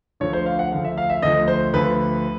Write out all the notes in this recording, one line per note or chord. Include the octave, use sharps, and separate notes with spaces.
D2 D3 F3 C#5
C5
F5
F#5
D2 D3 F3 F5
E5
F5
E5
D2 D3 F3 D#5
C5
D2 D3 F3 B4